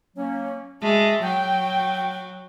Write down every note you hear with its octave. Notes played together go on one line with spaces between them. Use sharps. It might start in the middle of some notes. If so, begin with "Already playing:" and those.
F#3 A#3 C#4
G#3 F#4 E5 A5
F#3 G5